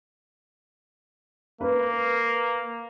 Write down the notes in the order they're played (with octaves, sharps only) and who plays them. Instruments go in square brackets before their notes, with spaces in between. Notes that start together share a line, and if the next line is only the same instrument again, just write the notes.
[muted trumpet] A#3 [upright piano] B4